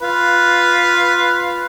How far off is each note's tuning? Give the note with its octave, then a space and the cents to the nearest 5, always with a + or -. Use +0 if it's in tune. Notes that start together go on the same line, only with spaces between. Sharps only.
F4 +0 B4 +0